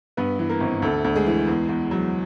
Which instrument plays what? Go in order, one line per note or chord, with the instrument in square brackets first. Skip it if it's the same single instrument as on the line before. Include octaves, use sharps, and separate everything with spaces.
[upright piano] G2 B3 B4
E3
A#3 A#4
G#1
D2 A3 A4
D2
G#3 G#4
E3
E2
E2
F#3